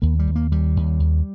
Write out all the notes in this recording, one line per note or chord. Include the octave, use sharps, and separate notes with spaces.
D#2 A#3
G3
D#2
A#3
D#2 G3
D#2
D#2